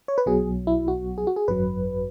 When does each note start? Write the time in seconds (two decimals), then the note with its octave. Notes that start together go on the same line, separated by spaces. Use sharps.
0.08 C#5
0.18 B4
0.26 B1 B2 F#3 G#4
0.67 E4
0.88 F#4
1.18 G#4
1.27 F#4
1.36 G#4
1.48 G#1 F#2 F#3 B4